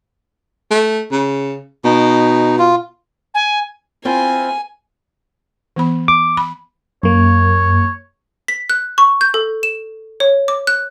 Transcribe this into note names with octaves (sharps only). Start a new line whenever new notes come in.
A3
C#3
B2 D#4
F4
G#5
C4 E4 F4 G#5
E3 B3 B5
D6
B5
F#2 A#3 C#5
B6
F#6
C#6
G6
A4
E7
C#5
D6
F#6